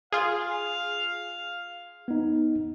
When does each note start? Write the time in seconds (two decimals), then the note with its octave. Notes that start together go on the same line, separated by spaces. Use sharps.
0.12 F4 G#4 F5
2.08 B3 D#4